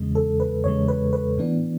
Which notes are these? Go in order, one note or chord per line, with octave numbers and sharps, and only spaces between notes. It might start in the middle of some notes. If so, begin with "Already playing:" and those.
Already playing: E2 C#3 G#3
A4
B4
E2 C#3 G#3 C#5
B4
B4
A2 E3 B3 D4